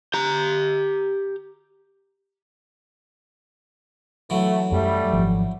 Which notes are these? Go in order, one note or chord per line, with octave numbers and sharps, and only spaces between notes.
G4 A#5
E3 F#3 A3
F#2 G3 A3
G#1 F3